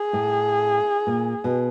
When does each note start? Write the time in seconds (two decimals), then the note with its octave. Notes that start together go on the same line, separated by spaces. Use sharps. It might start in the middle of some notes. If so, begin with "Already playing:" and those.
Already playing: G#4
0.13 A2
1.07 A#2
1.44 B2